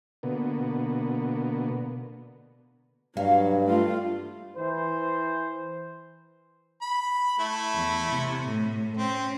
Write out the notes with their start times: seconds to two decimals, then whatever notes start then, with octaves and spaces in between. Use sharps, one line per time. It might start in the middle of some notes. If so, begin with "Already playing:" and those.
0.23 B2 D3 A#3 B3
3.17 G2 F#3 F5
3.66 A3 F4
4.56 E3 C5
6.82 B5
7.39 A3 E4
7.75 E2
8.08 C3
8.49 A2
8.97 C4 C#4